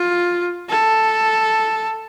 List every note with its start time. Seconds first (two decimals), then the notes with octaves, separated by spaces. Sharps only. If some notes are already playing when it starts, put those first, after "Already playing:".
Already playing: F4
0.70 A4